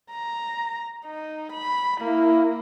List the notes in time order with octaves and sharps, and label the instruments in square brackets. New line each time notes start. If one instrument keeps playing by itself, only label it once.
[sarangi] A#5
D#4
B5
[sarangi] A#3 [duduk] E4